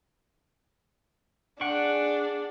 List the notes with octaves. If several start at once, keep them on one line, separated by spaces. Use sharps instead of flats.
D4 G#4 F#5 G5 C#6